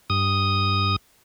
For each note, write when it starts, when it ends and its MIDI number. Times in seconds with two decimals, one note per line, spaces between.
0.10 0.96 43
0.10 0.96 87